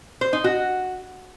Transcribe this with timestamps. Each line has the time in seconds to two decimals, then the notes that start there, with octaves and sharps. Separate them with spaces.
0.21 C5
0.33 D#4
0.44 F#4